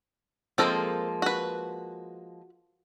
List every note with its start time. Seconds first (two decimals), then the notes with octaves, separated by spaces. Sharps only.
0.58 F3 G#3 A#3 C4 A4 A#4
1.22 F#4 B4